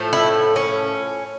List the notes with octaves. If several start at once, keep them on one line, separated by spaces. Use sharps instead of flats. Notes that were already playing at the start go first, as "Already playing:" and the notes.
Already playing: A2 F3 A3
E4
C#4